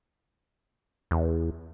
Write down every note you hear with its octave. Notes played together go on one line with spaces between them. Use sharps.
E2